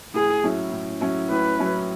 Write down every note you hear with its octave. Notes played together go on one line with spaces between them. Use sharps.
A2 G#4
F#3 C#4 E4
A2
F#3 C#4 E4
A2 B4
F#3 C#4 E4